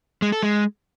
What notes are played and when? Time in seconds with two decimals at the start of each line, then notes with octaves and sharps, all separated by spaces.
0.22 G#3
0.32 A4
0.43 G#3